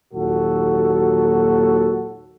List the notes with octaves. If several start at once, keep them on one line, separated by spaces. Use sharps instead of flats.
G#1 D#2 A#2 F#3 F#4 A4